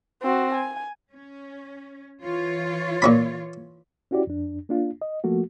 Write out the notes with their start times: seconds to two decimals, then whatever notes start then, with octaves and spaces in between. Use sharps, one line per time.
0.23 C4 F#4
0.54 G#5
1.12 C#4
2.23 E3 F4 C#5
3.02 A#2 C#4 B5
4.11 C#4 E4 F#4 G4 D5
4.27 F2 D4
4.69 A#3 D4 F4
5.02 D#5
5.24 F3 A3 A#3 F#4